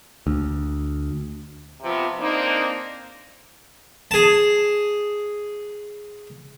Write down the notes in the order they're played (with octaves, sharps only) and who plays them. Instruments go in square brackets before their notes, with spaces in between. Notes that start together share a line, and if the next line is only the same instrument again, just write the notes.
[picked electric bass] D2
[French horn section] C3 F3 B3 C4 F4
A#3 C4 D4 D#4
[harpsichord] G#4 A5